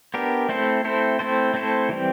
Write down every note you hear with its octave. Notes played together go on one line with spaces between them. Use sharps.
B3 D4 G4 A#4
A3 C4 E4 A4 C5
A3 C4 E4 A4 C5
A3 C4 E4 A4 C5
A3 C4 E4 A4 C5
E3 G3 C4